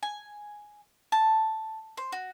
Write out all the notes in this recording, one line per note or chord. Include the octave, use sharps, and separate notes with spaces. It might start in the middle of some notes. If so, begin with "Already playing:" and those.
G#5
A5
C5
F#4